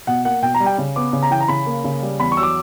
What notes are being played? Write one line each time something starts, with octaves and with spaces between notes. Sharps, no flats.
B2 F#5
A#3 F#5
B2 G5
A#5
G3
G5
C#3
B3 D6
C#3
A#5
E3 G5
A#5
C#3 B5
A#3
C#3
G3
E2 B5
C#6
F#3 E6
D6